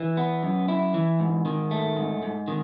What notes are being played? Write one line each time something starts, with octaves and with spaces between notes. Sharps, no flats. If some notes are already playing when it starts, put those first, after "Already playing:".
Already playing: E3
B3
F#2
E4
E3
G#2
D#3
A3
G#2
G#2
D#3